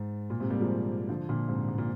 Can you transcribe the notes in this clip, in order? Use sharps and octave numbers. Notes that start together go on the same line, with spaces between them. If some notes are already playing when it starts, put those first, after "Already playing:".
Already playing: G#2
A#2
G#2 C3
G3 A#3
F3 G#3
D3 F3
A#2 D3
G#2 C3
G#2
A#2